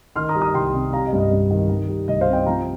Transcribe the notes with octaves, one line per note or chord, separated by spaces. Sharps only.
D#3 C6 F6
A#5 D#6
G3
A#5 D#6
C2 G5 C6
C3
G3 F5 A#5
D#5
G2
D#5
G2
D#3
D#3
G3
C2 D#5
C5 F5
C3
D#5 G5
F3 F5 A#5